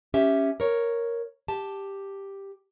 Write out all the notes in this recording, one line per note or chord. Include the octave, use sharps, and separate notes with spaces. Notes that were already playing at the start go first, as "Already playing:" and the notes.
C#4 G4 E5
A#4 C#5
G4 A5